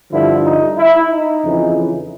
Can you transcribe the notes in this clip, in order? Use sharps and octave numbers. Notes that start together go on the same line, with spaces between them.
G2 D3 F3 E4
D#4
E4
D#4
F2 C#3 E3